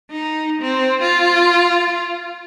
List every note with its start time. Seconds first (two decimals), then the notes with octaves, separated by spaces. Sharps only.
0.11 D#4
0.61 C4
1.01 F4